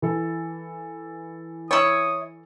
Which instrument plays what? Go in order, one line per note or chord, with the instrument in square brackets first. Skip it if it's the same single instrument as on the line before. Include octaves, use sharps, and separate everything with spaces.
[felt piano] E3 A4
[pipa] E4 C#5 [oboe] D#6